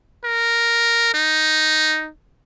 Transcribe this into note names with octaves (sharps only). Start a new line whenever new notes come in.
A#4
D#4